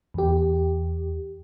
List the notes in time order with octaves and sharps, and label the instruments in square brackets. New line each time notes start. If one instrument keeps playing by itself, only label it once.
[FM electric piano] E2 G4